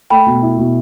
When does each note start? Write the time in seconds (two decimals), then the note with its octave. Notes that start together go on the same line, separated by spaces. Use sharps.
0.10 A3 G5 B5
0.26 B2
0.42 E4
0.58 B2